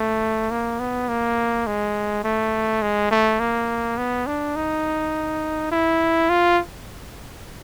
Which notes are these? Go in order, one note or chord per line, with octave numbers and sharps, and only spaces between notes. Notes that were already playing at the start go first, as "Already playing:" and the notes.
Already playing: A3
A#3
B3
A#3
G#3
A3
G#3
A3
A#3
B3
D4
D#4
E4
F4